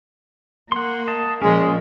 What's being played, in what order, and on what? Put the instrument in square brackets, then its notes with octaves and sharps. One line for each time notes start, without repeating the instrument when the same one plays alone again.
[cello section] A#3 [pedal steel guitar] F#5 C6
[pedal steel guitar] D#5 A5
[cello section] A#2 F3 [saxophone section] G#3 [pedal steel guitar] C#4 A#4